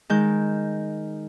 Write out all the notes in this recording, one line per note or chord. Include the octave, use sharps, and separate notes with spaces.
D#3 G#3 G6